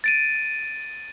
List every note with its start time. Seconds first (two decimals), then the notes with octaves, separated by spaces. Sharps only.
0.04 A6 D7 D#7